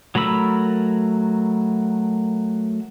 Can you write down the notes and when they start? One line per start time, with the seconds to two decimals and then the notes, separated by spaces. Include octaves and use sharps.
0.15 F#3 A3 A#4 B5 E6